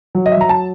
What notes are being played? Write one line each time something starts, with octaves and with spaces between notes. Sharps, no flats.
F#3
D#5
E5
F#3 A#5
A5